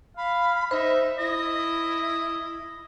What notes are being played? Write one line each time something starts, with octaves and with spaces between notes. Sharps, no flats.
F5 B5
D#4 C5 E5
E4 D#5